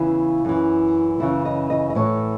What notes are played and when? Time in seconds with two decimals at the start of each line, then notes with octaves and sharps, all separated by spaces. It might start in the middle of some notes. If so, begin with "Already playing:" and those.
Already playing: E2 C#3 E3 E4
0.45 F#2 E3
1.20 F#2 C#3 E3 E4
1.45 D#5
1.70 D#5
1.90 D#5
1.95 A2 E3 C#5